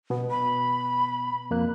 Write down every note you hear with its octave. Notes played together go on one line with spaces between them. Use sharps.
B2 B3
B5
F2 A#3 F#6